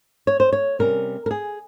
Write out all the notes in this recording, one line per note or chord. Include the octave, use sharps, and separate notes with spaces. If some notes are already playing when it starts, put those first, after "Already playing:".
C#5
C5
C#5
C3 G3 C#4 A#4
A#4
G#4